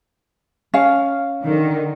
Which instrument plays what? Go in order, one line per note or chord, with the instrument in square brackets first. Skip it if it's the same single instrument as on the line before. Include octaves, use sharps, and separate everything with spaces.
[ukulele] C#4 F5
[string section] D3 D#3